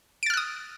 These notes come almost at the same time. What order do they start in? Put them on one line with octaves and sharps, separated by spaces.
D7 A6 F6 F#6 D#6